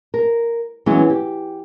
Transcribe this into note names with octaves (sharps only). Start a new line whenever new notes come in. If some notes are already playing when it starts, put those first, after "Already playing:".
A#4
E3 F#3 G#3 B3 C#4 E4
G4